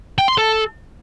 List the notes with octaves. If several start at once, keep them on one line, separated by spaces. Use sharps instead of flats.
G5
C6
A4